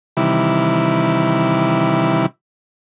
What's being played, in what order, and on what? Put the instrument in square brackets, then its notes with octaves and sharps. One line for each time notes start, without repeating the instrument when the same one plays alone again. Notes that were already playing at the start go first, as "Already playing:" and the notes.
[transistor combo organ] C3 D#3 E3 G3 E4